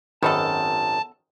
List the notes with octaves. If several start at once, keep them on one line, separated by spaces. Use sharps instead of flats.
G#1 F#2 D#3 B3 D#4 A4 A5